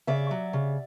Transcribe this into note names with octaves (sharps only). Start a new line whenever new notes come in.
C#3 D5 E5
F#3
C#3